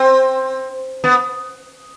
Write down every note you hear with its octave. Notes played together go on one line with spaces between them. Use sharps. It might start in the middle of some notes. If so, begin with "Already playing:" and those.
Already playing: C4
B3